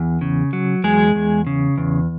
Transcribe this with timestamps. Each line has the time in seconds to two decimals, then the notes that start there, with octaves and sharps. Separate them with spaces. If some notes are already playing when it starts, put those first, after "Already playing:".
Already playing: E2
0.21 C#3
0.53 F#3
0.84 E2 G#3 G#4
1.15 E2
1.47 C#3
1.78 E2